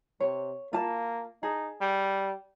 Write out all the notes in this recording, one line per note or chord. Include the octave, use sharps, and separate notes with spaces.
C3 C#5
A#3 F4 A5
D#4 G#4 A5
G3